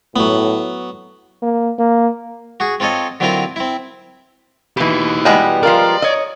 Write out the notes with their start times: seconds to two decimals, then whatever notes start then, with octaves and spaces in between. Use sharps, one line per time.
0.16 A2 F#3 B3
1.42 A#3
1.79 A#3
2.60 F#4 G#4
2.80 C4 F4 A4 C#5 D#5
3.20 D3 F#3 C4 E4 F4 A#4
3.56 C4 E4
4.77 B2 E3 D#4 G4
5.25 G3 G#3 B3
5.63 F3 F4 A#4 D5
6.02 C#5 D#5